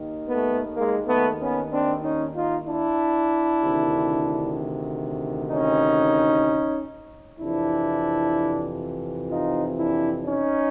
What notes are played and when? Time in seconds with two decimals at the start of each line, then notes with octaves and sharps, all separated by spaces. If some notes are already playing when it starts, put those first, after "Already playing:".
Already playing: D#2 D#3
0.29 A3 B3
0.76 G#3 A#3
1.07 A3 B3
1.39 B3 C#4
1.71 C4 D4
2.02 C#4 D#4
2.34 D#4 F4
2.65 D4 E4
3.61 D2 C3 D#3
5.51 C#4 D#4
7.40 F2 C3 E3 D4 E4
9.30 D#4 F4
9.77 D4 E4
10.25 C#4 D#4